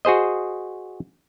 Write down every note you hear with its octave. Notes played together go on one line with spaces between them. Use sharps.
F#4 G#4 C5 D#5